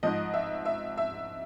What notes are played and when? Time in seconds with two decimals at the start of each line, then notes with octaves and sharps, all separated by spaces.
0.03 G#2 F3 D#5
0.34 E5
0.65 E5
0.98 E5